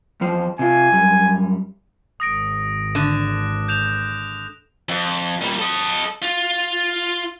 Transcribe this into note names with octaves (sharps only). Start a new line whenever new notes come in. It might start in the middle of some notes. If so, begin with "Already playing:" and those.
E2 F3 C5
C3 F4 G#5
F#2 G3
G#1 D#6 A#6 D7
D3 F#6 E7
G6 E7 F7
F2
A#2 G3
A4 D#5
F4